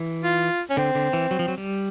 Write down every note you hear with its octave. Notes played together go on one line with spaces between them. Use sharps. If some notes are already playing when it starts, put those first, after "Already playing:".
Already playing: E3
F4
C#4
D3 C4
D3
E3
F#3
F3
F#3
G3